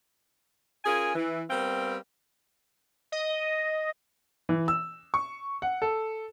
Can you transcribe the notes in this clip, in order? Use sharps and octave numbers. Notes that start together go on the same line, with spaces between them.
C#4 F4 G#4 A#4 G#5
E3
G3 B3 C4 A#4 F5 G5
D#5
E3
E6
C#6
F#5
A4